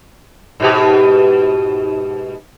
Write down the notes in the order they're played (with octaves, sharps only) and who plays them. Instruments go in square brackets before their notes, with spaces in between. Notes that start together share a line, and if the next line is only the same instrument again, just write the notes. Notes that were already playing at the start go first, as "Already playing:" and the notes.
[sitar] G#2 B2 G4